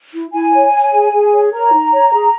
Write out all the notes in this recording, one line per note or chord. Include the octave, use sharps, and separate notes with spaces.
E4
E4 G#5
C#5
C#5
G#4
G#4
C#5
A#4 A#5
D#4
C#5
G#4